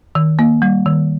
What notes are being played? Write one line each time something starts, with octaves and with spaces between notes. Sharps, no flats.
D#3
A#3
G3
D#3